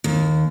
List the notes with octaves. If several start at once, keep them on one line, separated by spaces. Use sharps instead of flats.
D#2